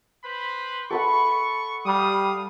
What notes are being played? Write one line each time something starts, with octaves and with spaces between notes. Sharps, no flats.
B4 C5 B5
A4 B4 F#5 C#6
G3 F5 D#6